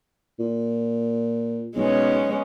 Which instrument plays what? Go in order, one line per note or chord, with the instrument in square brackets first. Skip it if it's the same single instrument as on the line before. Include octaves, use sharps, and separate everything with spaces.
[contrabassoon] A#2
[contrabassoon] B1 [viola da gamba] G#3 B3 C#4